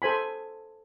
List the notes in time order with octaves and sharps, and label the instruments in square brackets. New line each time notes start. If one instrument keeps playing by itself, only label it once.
[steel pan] A4 C5 G#5 B5